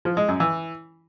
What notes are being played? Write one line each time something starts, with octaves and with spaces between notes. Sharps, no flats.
F3
G#3
F#2
E3